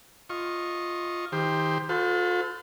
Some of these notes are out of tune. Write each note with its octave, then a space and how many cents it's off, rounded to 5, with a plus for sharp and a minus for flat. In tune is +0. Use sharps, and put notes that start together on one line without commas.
F4 +0 D#5 +0 C#6 -20
D#3 +25 G4 +20 C5 +0
F4 +40 A4 +0 C5 -40